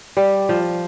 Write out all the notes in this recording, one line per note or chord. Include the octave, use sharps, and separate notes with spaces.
G3
F3